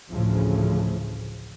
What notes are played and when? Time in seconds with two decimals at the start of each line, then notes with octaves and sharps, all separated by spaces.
0.11 A1 D2 A2 C#3 F3